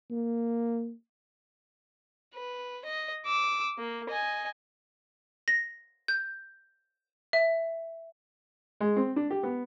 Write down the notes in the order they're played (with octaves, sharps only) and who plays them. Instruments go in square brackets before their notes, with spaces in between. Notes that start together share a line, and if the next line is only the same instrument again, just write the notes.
[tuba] A#3
[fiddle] B4
D#5
D6 E6
A#3
D#5 G#5
[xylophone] A#6
G6
E5
[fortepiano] G#3
C4
D4
G4
B3